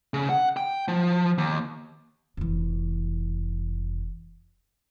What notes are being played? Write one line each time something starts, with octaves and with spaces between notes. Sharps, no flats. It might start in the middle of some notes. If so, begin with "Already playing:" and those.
C#3
F#5
G5
F3
D#2
F1 E3